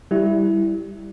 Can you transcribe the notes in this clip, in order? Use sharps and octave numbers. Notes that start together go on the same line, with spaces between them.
G3 E4